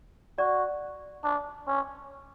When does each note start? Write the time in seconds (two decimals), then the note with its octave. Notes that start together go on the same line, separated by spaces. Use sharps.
0.38 F#4 D5
1.24 D4
1.67 C#4